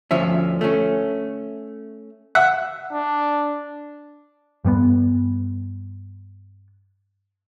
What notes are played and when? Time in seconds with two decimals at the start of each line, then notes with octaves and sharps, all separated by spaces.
0.11 D2 F3 C#4 E5
0.61 A3 C#4
2.35 E5 F#5
2.93 D4
4.65 G2 G3 A#3 B3